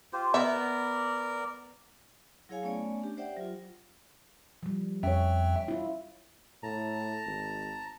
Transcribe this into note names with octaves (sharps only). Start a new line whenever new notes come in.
F4 G4 C5
B3 A#4 D5 E5
F#3 E4 G#4 C#5 F5 G#5
A3 B3 C#4 C#5 D5 G#5
D4 G4
G4 C5 D5 E5 F#5 G5
F#3 F4
F3 G3
F2 C#4 C#5 E5 G5
E4 F4
A2 A5 A#5
G#1